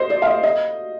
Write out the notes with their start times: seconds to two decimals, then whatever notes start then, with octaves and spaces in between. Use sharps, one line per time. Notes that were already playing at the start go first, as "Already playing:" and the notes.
Already playing: C5 D#5
0.10 D5
0.22 F5
0.27 D#5
0.43 D#5